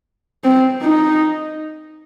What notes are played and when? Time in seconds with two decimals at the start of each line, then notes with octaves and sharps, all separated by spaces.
0.44 C4
0.82 D#4